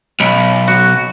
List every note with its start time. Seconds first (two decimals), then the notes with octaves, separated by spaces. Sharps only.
0.20 B1 B5
0.68 F#4